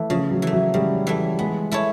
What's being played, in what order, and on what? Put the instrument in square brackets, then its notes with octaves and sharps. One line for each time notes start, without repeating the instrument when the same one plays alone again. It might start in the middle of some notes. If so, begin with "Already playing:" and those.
Already playing: [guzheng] E3 A3
[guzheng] C#3 [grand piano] F3
[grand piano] F#3
[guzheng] E3 A3
[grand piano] F#3
[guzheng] C#3 [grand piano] G3
[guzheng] E3 A3
[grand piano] G#3 [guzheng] B3
[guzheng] E4 A4 C#5